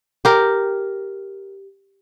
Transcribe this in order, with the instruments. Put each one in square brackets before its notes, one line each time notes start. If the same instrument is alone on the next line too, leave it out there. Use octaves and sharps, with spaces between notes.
[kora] G4 A#4